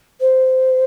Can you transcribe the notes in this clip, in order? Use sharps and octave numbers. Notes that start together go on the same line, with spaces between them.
C5